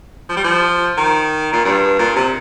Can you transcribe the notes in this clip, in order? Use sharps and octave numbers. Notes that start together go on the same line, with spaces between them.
F3
G3
F3
D#3
A#2
G2
A#2
C3